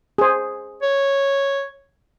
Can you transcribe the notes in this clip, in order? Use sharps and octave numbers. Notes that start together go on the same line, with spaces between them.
G#4 C5
C#5